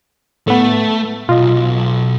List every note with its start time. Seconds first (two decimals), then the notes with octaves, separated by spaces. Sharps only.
0.47 A2 A3 B3
1.29 B1 F4 D#5